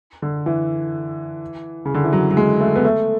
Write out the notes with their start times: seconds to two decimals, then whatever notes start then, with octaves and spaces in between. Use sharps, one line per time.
0.22 D3
0.46 E3
1.85 C#3
1.94 D3
2.04 E3
2.13 F#3
2.31 F#3
2.37 G#3
2.60 A3
2.76 B3
2.85 A3